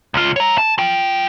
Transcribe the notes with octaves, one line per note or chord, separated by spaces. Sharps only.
C#2 F4
C#5 A#5
A5
F4 G5